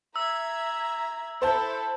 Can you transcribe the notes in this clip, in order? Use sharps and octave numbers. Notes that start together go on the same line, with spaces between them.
E5 A#5 E6 G#6
E4 A4 C5 A5 G6